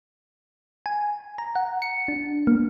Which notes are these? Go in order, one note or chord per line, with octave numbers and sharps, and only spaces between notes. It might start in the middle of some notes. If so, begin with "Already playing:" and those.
G#5
A#5
F#5
C#7
D4
A#3